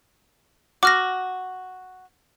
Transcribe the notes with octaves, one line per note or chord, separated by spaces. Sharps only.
F#4 D6 F6 A#6